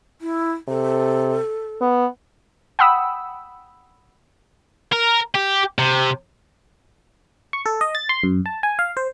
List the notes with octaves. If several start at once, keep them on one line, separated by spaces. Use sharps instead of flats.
E4
C3 A4
B3
F#5 G5 B5 D#6 E6
A#4
G4
C3
C#6
A4
D#5
A6
C6
F#2
A5
G#5
F5
C5